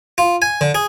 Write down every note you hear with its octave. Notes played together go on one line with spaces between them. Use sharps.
F4
G#5
D3
G#4